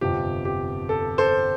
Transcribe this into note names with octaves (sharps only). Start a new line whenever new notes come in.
G1 F2 C3 F3 G4
G4
A4
A4 C5